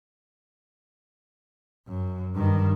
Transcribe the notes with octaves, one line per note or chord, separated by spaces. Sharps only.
F#2
G2 D#3